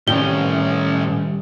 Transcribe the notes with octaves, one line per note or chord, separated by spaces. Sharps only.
A2 C3 D#3 G3 C#4 G7